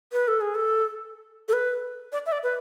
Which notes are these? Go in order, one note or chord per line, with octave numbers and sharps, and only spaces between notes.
B4
A4
G#4
A4
A4
B4
D5
E5
D5
B4